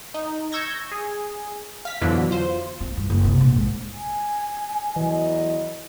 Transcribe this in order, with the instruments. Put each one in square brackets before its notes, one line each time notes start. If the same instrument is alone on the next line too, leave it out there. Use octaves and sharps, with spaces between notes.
[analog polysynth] D#4
C#6 E6 G6 G#6 A#6
G#4
F5 B6
F2 B2 D3 E3 F#3
F4 C5
[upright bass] C4
G2
F#1
C3
A#1
G#2
[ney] G#5
[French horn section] E2 F#3 D#5 [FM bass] E3